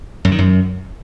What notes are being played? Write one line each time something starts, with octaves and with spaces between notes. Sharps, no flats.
F#2
D#3
F#2